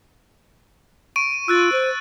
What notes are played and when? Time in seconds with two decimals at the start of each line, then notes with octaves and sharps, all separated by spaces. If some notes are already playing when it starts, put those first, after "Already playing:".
1.16 C#6 D7 D#7
1.48 F4 E6 F#6 A6
1.72 C5